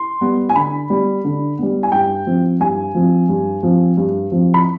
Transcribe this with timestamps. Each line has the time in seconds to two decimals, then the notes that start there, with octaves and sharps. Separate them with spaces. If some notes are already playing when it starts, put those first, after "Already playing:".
Already playing: C6
0.21 G3 B3
0.49 G#5
0.56 D3 B5
0.90 G3 B3
1.24 D3
1.59 G3 B3
1.83 G#5
1.92 G2 G5
2.26 F3 C4
2.60 G2 G#5
2.95 F3 C4
3.29 G2
3.63 F3 C4
3.97 G2
4.32 F3 C4
4.54 B5